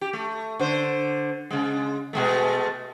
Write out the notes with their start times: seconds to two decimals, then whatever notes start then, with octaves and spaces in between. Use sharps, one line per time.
0.01 G4
0.13 A3
0.60 D3 C5
1.51 C#3 G#3
2.13 B2 G#3 A3